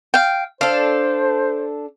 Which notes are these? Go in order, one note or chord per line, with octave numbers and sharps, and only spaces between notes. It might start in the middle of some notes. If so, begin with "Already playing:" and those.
F5 G5
D4 A4 C5 F5